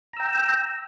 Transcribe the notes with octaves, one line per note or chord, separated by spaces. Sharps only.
G5 A#5 E6